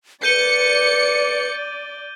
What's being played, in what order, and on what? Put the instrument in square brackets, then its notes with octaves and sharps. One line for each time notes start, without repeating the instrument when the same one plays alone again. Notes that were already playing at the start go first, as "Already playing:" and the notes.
[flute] B4 [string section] D5 [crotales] G6 D#7 G7 [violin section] C#7